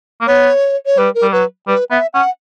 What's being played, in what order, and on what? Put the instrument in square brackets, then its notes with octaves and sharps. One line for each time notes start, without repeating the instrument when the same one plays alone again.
[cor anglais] A#3
[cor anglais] B3 [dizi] C#5
[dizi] C#5
[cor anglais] G3 [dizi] B4
[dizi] A#4
[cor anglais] G3
[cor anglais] F#3 [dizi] B4
[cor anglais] G3 [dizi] B4
[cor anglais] B3 [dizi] E5
[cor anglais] C#4 [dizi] F#5